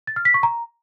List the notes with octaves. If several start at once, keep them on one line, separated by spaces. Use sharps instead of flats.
A6
F6
B6
C#6
A#5